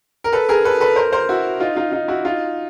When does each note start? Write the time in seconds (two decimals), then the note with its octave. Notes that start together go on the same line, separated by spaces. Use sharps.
0.24 A#4
0.33 A4 B4
0.49 G#4 A#4
0.64 A4 B4
0.80 A4 B4
0.96 A#4 C5
1.12 A#4 C5
1.29 E4 F#4
1.60 D#4 F4
1.76 D#4 F4
1.92 D#4 F4
2.08 E4 F#4
2.25 D#4 F4